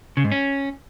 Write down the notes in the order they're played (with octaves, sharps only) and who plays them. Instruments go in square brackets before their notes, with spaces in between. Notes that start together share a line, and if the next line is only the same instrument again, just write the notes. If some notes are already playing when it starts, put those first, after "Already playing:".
[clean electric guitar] C#3
G#2
C#4